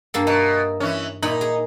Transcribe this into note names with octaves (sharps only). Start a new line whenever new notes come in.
G2 A#3 A4
B2 D#4
E3 C#4
A#2 D#4 G#5 B5
G#4